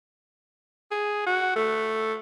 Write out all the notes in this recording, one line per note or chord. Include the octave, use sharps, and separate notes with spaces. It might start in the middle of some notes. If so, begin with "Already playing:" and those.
G#4
F#4
A3